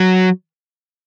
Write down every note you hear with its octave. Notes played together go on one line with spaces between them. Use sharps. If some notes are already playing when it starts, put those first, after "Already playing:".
Already playing: F#3